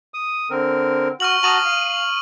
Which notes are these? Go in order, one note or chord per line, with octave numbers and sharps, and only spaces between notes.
D#6
D3 C4 A#4
F#4 C#6 F6 F#7
F#4 A5 A#5 D#6 D#7 F#7
F5